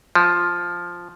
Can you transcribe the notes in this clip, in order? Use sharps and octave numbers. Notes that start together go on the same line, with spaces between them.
F3